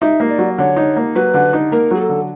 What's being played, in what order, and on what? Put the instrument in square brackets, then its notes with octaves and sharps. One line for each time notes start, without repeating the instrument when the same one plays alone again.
[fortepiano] D#4 [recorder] E5
[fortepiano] A#3
[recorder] D5
[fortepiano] F#3
[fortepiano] D3 [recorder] C#5
[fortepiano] D#4
A#3
[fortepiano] F#3 [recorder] B4
[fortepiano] D3
D#4
[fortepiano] A#3 [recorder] A#4
[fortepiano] F#3 [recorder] G#4
[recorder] A4
[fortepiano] D3